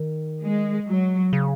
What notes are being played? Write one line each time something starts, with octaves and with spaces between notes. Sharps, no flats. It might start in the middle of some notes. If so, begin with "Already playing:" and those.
Already playing: D#3
G#3
F#3
C#3